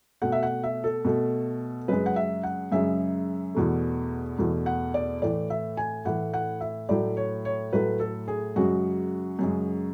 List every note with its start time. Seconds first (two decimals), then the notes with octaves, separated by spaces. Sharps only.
0.22 B2 A3 F#5
0.32 E5
0.43 F#5
0.63 E5
0.84 A4
1.05 B2 A3
1.88 F#2 C#3 G#3 B4
2.06 F#5
2.16 E5
2.43 F#5
2.72 F#2 C#3 G#3 E5
3.55 E2 B2 A3
4.39 E2 B2 A3
4.66 F#5
4.94 D5
5.22 A2 E3 A3 D5
5.50 E5
5.77 G#5
6.05 A2 E3 A3 F#5
6.34 F#5
6.61 E5
6.89 A2 F#3 A3 D5
7.17 C#5
7.45 C#5
7.73 A2 F#3 A3 B4
8.00 A4
8.28 G#4
8.56 F#2 C#3 G#3 F#4
9.39 F#2 C#3 G#3